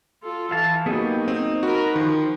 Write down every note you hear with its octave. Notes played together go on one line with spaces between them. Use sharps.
F4 A4
E3 F5 A5
F#3 A#3 B3 D#4 G4 G#4
C4 D#4
F#4 A#4 B4
D#3 F3